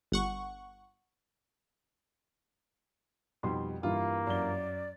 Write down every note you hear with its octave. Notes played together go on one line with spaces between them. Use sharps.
G1 F#5 C#6
F2 B2 G3 D#4 C6
G2 E3 A#3 E4 F4
F#2 D5 G7